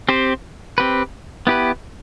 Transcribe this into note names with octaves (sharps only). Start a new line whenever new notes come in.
C4 G4 C5
C4 G4 B4
B3 E4 G4 B4